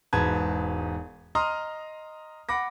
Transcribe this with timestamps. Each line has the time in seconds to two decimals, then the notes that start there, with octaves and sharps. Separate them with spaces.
0.13 E1 G#2 B4 A5 G#6
1.35 D#5 A#5 C6 D#6 F6
2.49 F#5 B5 D6 A#6